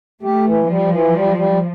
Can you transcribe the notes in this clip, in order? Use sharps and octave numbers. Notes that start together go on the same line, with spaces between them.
A3 G4
E3
F3 G3
E3
G3
G3